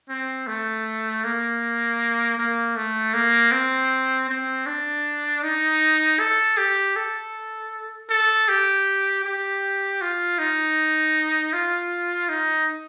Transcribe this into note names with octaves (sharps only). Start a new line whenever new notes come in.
C4
A3
A#3
A#3
A3
A#3
C4
C4
D4
D#4
A4
G4
A4
A4
G4
G4
F4
D#4
F4
D#4